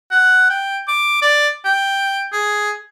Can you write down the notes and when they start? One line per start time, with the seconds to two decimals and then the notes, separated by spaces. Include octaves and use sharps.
0.11 F#5
0.50 G5
0.88 D6
1.22 D5
1.65 G5
2.33 G#4